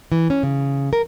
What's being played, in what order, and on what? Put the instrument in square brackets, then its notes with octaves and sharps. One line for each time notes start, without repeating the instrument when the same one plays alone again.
[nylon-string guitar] E3
C#4
C#3
A#4